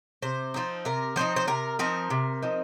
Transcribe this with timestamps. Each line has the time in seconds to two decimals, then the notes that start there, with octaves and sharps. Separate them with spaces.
0.22 C3 C5
0.54 F3 C4 D#4
0.85 C3 A#4
1.16 F3 C4 D#4 C5
1.36 C5
1.47 C3 A#4
1.79 F3 C4 D#4 A#4
2.10 C3
2.42 F3 C4 D#4